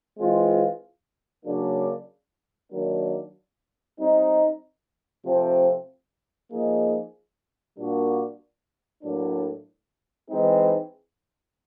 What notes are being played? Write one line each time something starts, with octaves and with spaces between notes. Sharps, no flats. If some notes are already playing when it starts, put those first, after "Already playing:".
E3 G#3 C4 F4
C#3 F#3 A#3 D4
D#3 F#3 A#3 D4
G3 C4 D#4
C3 F3 A3 C4
F3 A#3 D#4 G#4
A#2 G3 A#3 D4 F#4
A2 F#3 A#3 D4
E3 G#3 C4 D#4 G#4